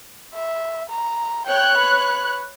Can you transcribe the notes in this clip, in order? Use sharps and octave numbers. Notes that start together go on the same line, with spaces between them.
E5
A#5
C#5 G5 F#6
B4